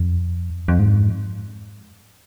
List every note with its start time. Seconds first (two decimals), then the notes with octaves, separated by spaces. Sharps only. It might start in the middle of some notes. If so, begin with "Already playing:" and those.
Already playing: F2
0.68 F2
0.79 G#2